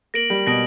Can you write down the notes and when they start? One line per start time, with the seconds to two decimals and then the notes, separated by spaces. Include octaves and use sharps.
0.14 A#3 A#6 D7 F#7
0.30 G3
0.47 B2 A#6 D7 F#7